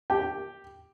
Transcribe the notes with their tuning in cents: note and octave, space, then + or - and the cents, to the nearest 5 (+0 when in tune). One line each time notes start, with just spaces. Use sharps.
G4 +0 G5 +0